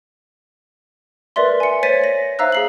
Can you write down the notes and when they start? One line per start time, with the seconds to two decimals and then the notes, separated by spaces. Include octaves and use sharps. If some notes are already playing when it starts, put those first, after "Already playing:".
1.36 A#4 B4 D5 E5 C6
1.60 G#5 C#7
1.83 C5 C#5 A6 B6 D#7
2.04 A#6
2.39 C5 E5 F5 A#5 E6 F#6
2.52 G#4 C7 F#7